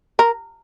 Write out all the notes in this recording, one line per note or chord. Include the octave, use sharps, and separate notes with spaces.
A#4